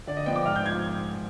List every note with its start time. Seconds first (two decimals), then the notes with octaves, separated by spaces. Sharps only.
0.07 D3 D5
0.17 D#5
0.26 F3 B3 D4 G5
0.36 D6
0.45 G#2 F6
0.56 G6
0.65 F3 G#6